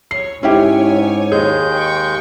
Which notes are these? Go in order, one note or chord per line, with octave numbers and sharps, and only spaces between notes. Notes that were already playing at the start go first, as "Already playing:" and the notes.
C#5 C7
G#2 C#4 E4 G4 C#5 G#5
D#2 G#3 G#4 G6
G5 C#6